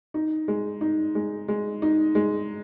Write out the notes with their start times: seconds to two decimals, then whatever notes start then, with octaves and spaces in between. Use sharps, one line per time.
0.14 D#4
0.48 G#3
0.81 D#4
1.15 G#3
1.48 G#3
1.82 D#4
2.15 G#3